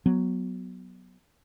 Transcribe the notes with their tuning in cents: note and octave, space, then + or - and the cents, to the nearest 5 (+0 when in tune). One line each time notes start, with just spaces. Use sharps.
F#3 +0 B3 +0